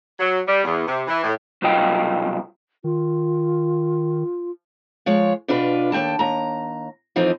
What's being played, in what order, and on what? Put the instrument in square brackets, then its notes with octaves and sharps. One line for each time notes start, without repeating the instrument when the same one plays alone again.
[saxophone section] F#3
G3
E2
C3
E3
A2
[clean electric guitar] C2 B2 F#3 F4 D#5 G5
[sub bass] D#3 [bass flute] F4
[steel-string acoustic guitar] F3 G#3 C#5
B2 D4 F4 B4
D#2 A3 G5 A5
D#2 A#5
F2 E3 F3 C4 D#4